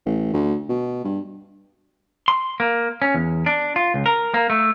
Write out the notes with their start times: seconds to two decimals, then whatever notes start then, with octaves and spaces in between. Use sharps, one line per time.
0.06 A1
0.33 D2
0.69 B2
1.04 G2
2.28 C6
2.60 A#3
3.02 C#4
3.15 E2
3.46 D4
3.76 F4
3.94 C#2
4.06 A#4
4.34 A#3
4.50 A3